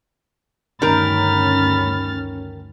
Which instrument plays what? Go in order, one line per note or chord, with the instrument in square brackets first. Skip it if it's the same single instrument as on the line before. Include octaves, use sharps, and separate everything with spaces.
[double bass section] D2 G2 C#4 [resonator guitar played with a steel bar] D#3 A#4 [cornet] B5 [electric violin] F6 A6